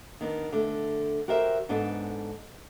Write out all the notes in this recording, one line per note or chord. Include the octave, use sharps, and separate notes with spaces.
D#3 B3 D4
D3 A3
F#4 G4 A#4 C5 E5
G#2 B3 D4 A4 B4